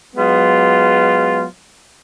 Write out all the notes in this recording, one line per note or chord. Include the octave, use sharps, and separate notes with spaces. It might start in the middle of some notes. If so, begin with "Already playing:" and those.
F#3 G#3 B3 F4